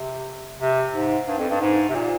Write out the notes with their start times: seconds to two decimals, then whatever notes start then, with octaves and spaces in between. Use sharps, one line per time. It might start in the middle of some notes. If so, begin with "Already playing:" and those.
Already playing: C3
0.60 C3
0.94 G#2
1.28 G2
1.39 F2
1.50 G2
1.61 G#2
1.89 C3
1.95 A#2